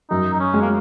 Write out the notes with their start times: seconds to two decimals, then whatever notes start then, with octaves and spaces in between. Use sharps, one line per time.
0.10 F#2 D#4
0.33 D#4
0.39 C#4
0.53 G#3
0.62 A#3